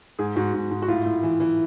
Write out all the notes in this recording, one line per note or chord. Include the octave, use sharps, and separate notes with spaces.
G#2 G#4
G#2 F#4
G#2
G#2
F#4
A2 F4
A2
E3
E3